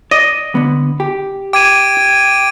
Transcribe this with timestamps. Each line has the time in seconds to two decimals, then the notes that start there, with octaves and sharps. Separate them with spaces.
0.11 D5 D#5
0.55 D3 B3
1.00 G4
1.53 G5 D6 G#6 D#7